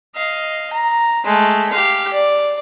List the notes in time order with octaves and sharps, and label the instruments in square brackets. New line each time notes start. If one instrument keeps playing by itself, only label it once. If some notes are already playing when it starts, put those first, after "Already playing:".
[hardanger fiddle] D#5 F5
A#5
G#3 A3
G4 F5
D5